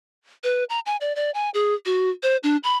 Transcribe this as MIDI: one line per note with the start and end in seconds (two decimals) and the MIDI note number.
0.44 0.64 71
0.70 0.80 82
0.86 0.97 80
1.01 1.15 74
1.16 1.31 74
1.34 1.50 80
1.54 1.75 68
1.86 2.10 66
2.23 2.37 72
2.43 2.57 62
2.63 2.77 83